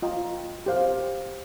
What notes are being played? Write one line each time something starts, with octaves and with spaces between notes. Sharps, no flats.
F4 D#5 G5 A#5
G4 C5 F5